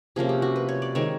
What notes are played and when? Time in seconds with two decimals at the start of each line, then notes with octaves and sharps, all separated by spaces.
0.16 C3 F3 A#3 C#4 G#4
0.29 G4
0.42 F#4
0.56 B4
0.69 C#5
0.82 D5
0.95 D#3 G#3 C4 C#5